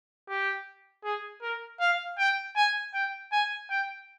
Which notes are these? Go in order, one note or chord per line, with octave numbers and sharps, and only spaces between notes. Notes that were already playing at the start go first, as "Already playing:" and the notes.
G4
G#4
A#4
F5
G5
G#5
G5
G#5
G5